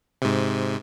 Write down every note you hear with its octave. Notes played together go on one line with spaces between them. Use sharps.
G#2 C3